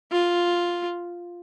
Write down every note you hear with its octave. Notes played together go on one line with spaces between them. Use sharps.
F4